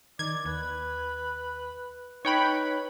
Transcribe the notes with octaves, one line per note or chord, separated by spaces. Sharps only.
D#3 D5 G#6
D#2 B4
D#4 B4 C#5 G5 B5